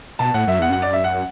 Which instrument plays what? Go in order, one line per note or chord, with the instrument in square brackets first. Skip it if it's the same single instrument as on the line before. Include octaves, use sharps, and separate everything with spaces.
[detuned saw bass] B2 [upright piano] A5
[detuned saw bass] A2 [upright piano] F#5
[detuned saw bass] F#2 [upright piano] E5
[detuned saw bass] E2 [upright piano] F#5
[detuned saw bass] F#2 [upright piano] F#5
[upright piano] D5
E5
F#5